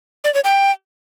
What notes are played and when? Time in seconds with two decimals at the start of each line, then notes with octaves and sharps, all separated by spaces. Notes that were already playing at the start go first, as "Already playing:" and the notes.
0.24 D5
0.34 C#5
0.44 G5